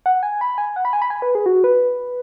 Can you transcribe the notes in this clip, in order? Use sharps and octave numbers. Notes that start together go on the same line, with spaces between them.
F#5
G#5
B5
G#5
F#5
B5
G#5
B5
G#5
B4
G#4
F#4
B4